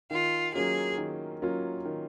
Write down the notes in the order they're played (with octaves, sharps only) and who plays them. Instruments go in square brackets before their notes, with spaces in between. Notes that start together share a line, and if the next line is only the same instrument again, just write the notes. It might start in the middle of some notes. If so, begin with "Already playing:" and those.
[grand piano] D#3 [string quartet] F4
[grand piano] F#3 A#3 C#4 F4 [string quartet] G#4
[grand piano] D#3
F#3 A#3 C#4 F4
D#3